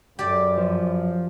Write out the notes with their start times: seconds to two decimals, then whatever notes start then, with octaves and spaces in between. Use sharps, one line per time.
0.19 F#2 G4 D5
0.58 F3